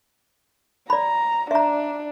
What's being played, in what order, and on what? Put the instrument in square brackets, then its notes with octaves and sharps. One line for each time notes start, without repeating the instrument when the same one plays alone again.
[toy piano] D5 B5 [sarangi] A#5
[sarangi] D4 [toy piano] E5 A#5